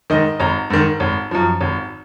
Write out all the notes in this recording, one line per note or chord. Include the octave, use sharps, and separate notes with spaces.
G#2 D#3 D#5
G#1 A#5
G#2 D#3
G#1
F#2 F3
G#1